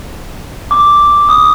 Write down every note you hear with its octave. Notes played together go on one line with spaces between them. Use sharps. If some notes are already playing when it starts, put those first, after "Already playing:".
D6
D#6